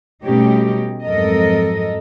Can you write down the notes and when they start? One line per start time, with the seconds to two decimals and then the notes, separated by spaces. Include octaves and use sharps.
0.24 B2 G3 A3 C#4 D#4 G4
1.04 F2 G#2 F#3 A4 A#4 D#5